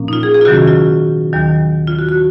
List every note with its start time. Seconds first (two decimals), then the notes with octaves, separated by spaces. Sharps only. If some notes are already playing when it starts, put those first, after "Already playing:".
Already playing: A#2 F3 A#3 C#4
0.08 D#4
0.13 F4
0.23 G#4
0.34 G#4
0.41 F4
0.45 C3 D#3 F#3 C#4 F#4
0.68 F4
1.33 D#2 D#3 F#3
1.87 F4
1.99 F#4
2.09 F#4